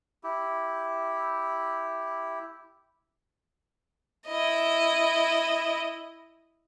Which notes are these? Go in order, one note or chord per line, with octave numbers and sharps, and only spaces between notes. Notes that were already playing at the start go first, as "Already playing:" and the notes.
E4 G4
E4 D#5